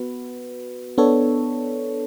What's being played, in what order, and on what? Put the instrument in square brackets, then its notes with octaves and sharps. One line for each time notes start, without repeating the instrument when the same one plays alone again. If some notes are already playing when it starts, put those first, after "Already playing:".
Already playing: [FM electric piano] B3 F#4 B4
B3 D4 A4 C#5